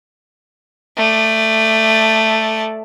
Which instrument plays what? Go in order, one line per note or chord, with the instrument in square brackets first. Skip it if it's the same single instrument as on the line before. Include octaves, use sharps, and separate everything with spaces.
[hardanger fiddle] A3 D5